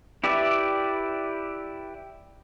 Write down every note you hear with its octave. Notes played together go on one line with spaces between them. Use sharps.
E4 G4 B4 D5 E5